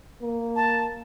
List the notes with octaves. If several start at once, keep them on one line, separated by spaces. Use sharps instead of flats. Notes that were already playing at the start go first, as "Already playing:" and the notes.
A#3
A5